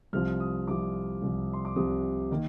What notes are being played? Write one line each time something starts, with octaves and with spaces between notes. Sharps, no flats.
C2 C3 F3 F6
D#6
C2 C3 F3 D6
C2 C3 F3
C6
D6
C2 C3 F3 D#6
D#3 A#3